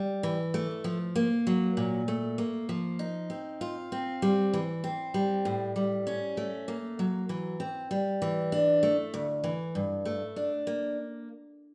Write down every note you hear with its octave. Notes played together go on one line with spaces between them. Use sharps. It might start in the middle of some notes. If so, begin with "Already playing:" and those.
Already playing: G3
E3
A3
F3
A#3
F#3
A#2
A3
A#3
F3
D#4
C4
F4
C4
G3
E3
C4
G3
A2
G3
C#4
A3
A#3
F#3
E3
C4
G3
E3
D4
A3
D2
E3
G2
A3
D4
A#3